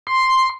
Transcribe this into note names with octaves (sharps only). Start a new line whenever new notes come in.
C6